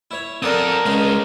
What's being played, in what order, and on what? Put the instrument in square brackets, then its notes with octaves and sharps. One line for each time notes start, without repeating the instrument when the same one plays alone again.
[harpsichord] E4 C#5
[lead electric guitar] C4 A4 [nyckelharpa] A#4 [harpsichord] D5 F#5 D#6
[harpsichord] C#2 D#5 F5 [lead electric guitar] G#3 C#4